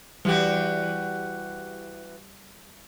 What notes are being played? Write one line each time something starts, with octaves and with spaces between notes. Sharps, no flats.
E3 G3 F#4 G4